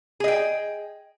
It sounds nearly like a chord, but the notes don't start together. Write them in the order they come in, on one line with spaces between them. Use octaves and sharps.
G#4 D#5 G5